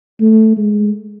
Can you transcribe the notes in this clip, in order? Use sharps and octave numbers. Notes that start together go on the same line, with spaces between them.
A3
G#3